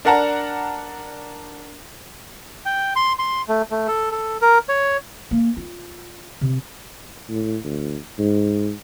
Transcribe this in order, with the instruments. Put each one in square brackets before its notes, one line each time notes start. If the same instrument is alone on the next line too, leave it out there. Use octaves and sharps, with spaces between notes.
[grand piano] D4 A#4 D5 F#5 A5 A#5
[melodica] G5
C6
C6
A3
A3
A4
A4
A#4
C#5
[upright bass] A#3
F4
C3
[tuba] A2
D2
G#2